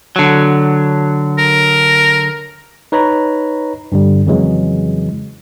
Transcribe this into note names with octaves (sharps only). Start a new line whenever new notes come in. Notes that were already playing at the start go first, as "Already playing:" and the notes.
D3 F#3
A#4
D#4 B4 C#5 A#5 B5
G2 D3 G3
F2 C#3 E3 F#3 G#3